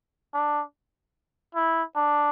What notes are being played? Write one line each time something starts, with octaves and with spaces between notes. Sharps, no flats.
D4
E4
D4